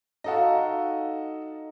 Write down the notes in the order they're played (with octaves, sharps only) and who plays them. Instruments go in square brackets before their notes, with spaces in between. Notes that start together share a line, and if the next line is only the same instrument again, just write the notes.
[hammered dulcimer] D#4 F5 [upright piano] F#4 A4 D#5